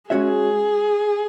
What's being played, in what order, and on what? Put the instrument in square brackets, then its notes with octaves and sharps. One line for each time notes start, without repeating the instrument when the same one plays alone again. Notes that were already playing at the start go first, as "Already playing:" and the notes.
[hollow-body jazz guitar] G#3 C#4 F#4 C#5 E5 [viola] G#4